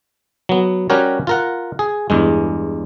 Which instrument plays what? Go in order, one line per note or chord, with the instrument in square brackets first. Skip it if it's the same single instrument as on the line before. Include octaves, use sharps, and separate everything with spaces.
[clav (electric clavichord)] F#3 B3
G3 C#4 F#4 G4 A#4 C#5
F4 A#4 F#5
G#4
E2 G2 G#3